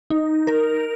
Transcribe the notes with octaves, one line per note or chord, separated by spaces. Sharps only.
D#4
A#4